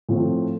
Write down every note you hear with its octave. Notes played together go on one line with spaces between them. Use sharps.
A2 F3 C4